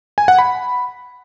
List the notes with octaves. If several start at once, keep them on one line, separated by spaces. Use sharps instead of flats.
G#5
F#5
B5